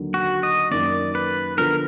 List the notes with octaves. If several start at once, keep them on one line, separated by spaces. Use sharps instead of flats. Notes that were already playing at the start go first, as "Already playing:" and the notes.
Already playing: D#2 D3 F#3
F#4
D#5
F#2 D#3 A#3 D5
B4
D3 F3 B3 A#4